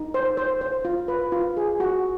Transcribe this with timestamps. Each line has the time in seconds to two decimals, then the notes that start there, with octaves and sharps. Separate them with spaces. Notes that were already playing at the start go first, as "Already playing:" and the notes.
Already playing: D#4
0.14 C5
0.37 C5
0.61 C5
0.85 F4
1.08 B4
1.32 F4
1.57 G#4
1.80 F#4